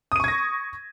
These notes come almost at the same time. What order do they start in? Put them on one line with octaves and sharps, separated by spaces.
D#6 D#7 C#6 G#6 A#6